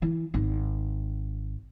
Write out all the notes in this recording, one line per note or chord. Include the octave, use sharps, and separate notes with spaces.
E3
G#1